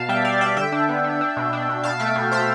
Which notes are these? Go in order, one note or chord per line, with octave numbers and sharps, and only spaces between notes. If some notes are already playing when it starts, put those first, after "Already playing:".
Already playing: B2 F5 A5
G3 E5 G5
G3 D5 F5
G3 E5 G5
D3 E5 G5
D4
B3
B3
D4
B2
D4
B2
B2 F5 A5
A3 E5 G5
B2
B2 C5 E5